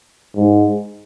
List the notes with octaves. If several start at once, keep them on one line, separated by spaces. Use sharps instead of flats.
G#2